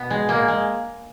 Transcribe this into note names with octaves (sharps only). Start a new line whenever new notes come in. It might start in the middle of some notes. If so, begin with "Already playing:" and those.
Already playing: B2 B3
G#3
G#3 A#3
G#3